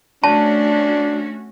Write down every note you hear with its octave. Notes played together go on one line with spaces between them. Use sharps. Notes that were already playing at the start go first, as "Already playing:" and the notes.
A3 C#4 D4 F#4 A5